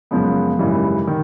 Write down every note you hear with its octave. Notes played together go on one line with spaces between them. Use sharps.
F#2 C#3 F3 G#3 B3
G#1 F#2 C#3 E3 G3
D#3